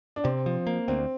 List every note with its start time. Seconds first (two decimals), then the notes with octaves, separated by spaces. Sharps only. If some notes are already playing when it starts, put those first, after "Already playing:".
0.16 D4
0.24 C3 C4
0.46 F3
0.67 A#3
0.88 D2 C4